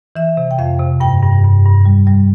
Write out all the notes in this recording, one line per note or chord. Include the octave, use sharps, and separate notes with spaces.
E3 E5
C3
G5
F2 F5
C3
G2 G5
G2
G2
G2
G3
G3